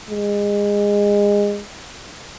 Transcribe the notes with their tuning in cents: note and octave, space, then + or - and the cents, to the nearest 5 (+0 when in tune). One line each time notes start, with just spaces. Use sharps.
G#3 -25